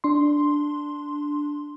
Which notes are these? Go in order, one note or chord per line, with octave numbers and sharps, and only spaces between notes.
D4 C6